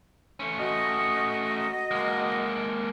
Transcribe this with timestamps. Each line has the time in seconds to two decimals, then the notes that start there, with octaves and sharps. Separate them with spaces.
0.40 A3 C#4
0.59 F#4 D#5
1.91 G#3 A#3